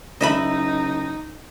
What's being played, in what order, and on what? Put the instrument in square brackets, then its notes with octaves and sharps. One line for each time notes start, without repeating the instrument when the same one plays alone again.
[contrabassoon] F#1 [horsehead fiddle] D#4 [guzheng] D#5 E5 B5